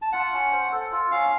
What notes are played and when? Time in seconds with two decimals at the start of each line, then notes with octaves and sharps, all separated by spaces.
0.02 A5
0.12 F4 F#5
0.33 C#4
0.52 C5
0.72 A4
0.92 F4
1.11 C#4 F5